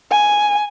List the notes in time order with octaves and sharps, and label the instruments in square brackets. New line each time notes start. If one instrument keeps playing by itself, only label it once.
[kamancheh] G#5